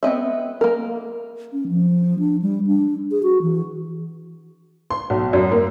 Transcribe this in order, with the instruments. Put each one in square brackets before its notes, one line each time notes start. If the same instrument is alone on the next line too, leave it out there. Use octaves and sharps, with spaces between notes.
[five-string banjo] B3 C4 D#5 E5
A#3 A#4
[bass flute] C#4
F3
D4
G3
D4
G#4
F#4
E3
[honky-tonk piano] C6
B1
F#2
A#3